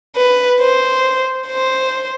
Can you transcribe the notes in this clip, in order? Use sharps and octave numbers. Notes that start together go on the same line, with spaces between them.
B4
C5
C5